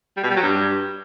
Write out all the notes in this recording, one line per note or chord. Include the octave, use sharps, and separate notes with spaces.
G3
B2
G3
F#3
G2